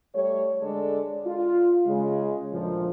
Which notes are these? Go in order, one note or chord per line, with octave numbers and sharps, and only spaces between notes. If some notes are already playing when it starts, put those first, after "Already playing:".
G3 A3 C#5
D3 G#3 A4 D5
F4
C#3 G#3
D2 A#2 F3